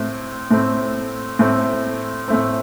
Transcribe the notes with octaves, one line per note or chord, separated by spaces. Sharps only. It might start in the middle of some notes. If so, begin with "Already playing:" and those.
Already playing: A2 A3 C4
A2 A3 C4
A2 A3 C4
A2 A3 C4